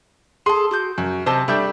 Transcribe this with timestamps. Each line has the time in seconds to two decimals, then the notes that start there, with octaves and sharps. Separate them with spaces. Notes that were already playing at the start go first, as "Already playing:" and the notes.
0.46 G#4 A4 C6
0.71 F#4 D6 G6
0.98 F#2 F#4
1.26 C3 C5 D#5 A5
1.48 G3 A3 D4 A4 E5 G6